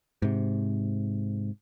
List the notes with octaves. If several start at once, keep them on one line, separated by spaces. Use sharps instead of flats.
G#2 C3